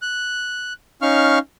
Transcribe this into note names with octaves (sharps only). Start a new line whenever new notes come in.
F#6
C#4 D#4 F5 C#6 F6